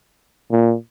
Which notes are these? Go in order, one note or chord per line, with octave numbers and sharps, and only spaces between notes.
A#2